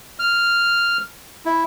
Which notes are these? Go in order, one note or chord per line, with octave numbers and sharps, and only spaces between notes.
F6
E4